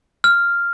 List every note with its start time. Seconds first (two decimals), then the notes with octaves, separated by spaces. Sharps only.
0.24 F6